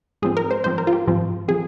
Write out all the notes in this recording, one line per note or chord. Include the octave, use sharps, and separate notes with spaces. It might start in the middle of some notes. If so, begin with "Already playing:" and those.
G#2 F3 C4 G#4
A#4
C5
G#2 F3 C4 C5
A#4
F4
G4
G#2 F3 C4
F3 C4 G#4